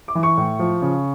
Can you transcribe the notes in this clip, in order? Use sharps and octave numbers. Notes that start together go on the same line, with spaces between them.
D6
E3
C#6
A2
F3
C#3